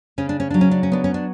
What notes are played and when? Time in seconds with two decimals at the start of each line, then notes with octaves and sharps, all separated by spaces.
0.18 C#3 C#4
0.29 D4
0.40 C#4
0.51 F#3 D4
0.61 C#4
0.71 D4
0.83 C#4
0.92 B3 D4
1.04 C#4
1.14 D4